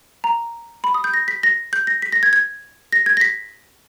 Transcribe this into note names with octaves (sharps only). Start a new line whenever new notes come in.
A#5
B5
D#6
G6
A#6
B6
A#6
G6
A#6
B6
A#6
G#6
G#6
A#6
G#6
A#6
B6